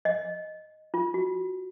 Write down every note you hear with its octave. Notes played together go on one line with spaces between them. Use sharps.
D#5
F4
F#4